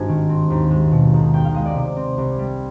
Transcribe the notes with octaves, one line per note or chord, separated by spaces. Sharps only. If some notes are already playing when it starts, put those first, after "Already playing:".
Already playing: G#1 G2 G#5
D#3
C4
D#2
G#3
B2
B1
B1 G5
F5
G#3 D#5
D5
C3
C4
C2
G3